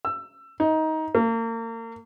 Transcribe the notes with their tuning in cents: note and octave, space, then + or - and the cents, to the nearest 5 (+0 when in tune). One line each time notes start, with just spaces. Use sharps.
E6 +20
D#4 +20
A#3 -35